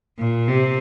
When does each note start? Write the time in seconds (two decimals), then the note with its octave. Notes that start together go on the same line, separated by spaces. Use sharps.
0.19 A#2
0.48 C3